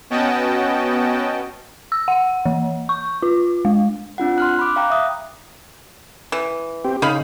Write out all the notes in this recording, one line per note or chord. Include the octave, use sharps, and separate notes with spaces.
B3 C#4 F#4 D#5 G5 A5
E6
F#5
E3
C#6
F4
G#3
C4 D4 F4 F#5
C6 F6 F#6
B5 D6
F5 G5 A#5 F#6
E5 D#6
E3
C4 G4
C#3 D#4 F5 B5